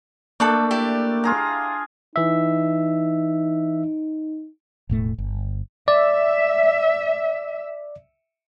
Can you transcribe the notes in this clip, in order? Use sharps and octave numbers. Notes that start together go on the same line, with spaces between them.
A3 A#3 D4 A4 B5 D6
E4 G4 D5
F4 G#4 A#5
E3 D#4 E5
E1 A2 A3
G1
D5 E5